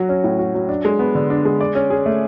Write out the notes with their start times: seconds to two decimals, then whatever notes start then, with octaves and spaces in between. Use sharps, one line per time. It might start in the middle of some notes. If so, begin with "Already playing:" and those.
Already playing: F#3 F#4
0.09 C#4
0.24 A2
0.39 F#4
0.55 F#3
0.69 D4
0.85 G#3
0.99 B3
1.15 D3
1.30 D4
1.45 G#3
1.61 D5
1.75 C#4
1.90 G#4
2.06 A3